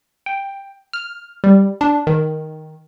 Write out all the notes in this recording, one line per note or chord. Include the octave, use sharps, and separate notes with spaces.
G5
F6
G3
D4
D#3